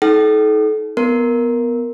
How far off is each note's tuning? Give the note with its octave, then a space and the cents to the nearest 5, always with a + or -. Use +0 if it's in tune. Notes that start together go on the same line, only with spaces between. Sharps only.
D#4 +40 A4 -35 G5 -40
B3 +0 A#4 +0